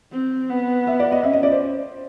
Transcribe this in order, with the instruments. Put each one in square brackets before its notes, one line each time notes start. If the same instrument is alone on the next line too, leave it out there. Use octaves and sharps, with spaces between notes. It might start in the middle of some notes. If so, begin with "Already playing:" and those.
[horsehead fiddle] C4
B3
[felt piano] E5
D5
D#5
[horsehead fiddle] C#4 [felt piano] E5
[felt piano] D#5
D5
C5